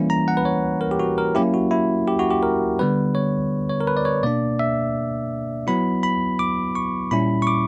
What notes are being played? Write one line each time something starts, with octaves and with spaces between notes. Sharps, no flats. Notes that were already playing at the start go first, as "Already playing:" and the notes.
Already playing: E3 G3 A#3 C#4 E4
A#5
F#5
B4
C#5
A#4
G4
F#4
A#4
F#3 A#3 C#4 E4 G4
F#4
E4
G4
F#4
G4
A#4
D3 G3 B3 B4
C#5
C#5
A#4
B4
D5
C#5
B2 A#3 D4 D5
E5
F#3 B3 E4 B5
B5
D6
C#6
A#2 G3 C#4 E4 B5
C#6
D6